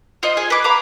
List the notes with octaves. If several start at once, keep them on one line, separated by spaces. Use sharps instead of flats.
F4 C5 D#5
G#4
B4 D6
F5 A#5 B5 D6